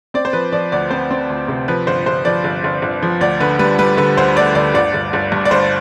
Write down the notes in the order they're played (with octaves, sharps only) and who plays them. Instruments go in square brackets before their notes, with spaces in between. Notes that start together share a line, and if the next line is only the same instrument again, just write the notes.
[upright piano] C4 D5
C5
F3 B4
F3 D5
D2 D5
C4 C5
C4
D2
C3
F3 B4
G1 C5
G1 C5
F3 D5
G1
G1
G1
F3
D2 D5
D3 B4
G3 B4
G3 B4
D3 B4
D2 C5
D2 D5
D2 D5
G1 D5
G1
G1
G2
D5
G1 C5